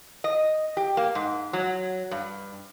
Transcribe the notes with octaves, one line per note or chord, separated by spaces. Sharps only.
D#5
G4
A#3
G#2
F#3
G2